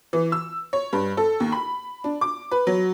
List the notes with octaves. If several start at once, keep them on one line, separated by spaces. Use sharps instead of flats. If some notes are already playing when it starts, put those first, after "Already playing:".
E3
E6
C#5
G2
A4
D#2
B5
D4
D6
B4
F#3